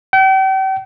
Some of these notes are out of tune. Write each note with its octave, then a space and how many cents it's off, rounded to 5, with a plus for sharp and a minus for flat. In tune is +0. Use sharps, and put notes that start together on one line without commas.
G5 -40